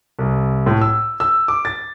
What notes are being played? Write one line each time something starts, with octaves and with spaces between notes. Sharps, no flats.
C2
A2
E6
E6
D6
A6